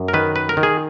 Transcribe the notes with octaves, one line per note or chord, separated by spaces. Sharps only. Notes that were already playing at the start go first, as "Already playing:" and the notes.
Already playing: F#2
A#4
D#3 B4
B4
A#4
D#3
G#4